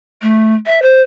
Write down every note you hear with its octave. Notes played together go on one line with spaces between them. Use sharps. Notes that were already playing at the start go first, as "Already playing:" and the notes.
A3
E5
C5